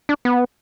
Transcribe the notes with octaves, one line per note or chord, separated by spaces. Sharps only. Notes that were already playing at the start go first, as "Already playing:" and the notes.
D4
B3